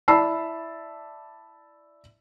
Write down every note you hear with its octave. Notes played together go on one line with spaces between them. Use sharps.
E4 D5 A5 B5 E6 C7